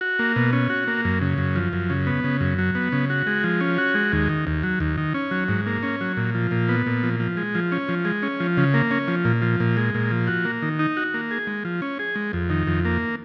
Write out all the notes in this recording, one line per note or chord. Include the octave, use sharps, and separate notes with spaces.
F#4
A#3
B2
C#4
F#4
A#3
F#2
C#3
F#2
F3
F#2
C#3
B3
C#3
F#2
F#3
B3
C#3
F#4
G#3
F3
C#4
F#4
G#3
D#2
D#3
D#2
F#3
D#2
D#3
C#4
F#3
G#2
A#3
C#4
F#3
A#2
F3
A#2
B3
A#2
F3
F3
G#3
F3
C#4
F3
G#3
C#4
F3
C#3
A#3
C#4
F3
A#2
F3
A#2
G#3
A#2
F3
F#4
A#3
D#3
D#4
F#4
A#3
G#4
G#3
F3
C#4
G#4
G#3
F2
D#3
F2
A#3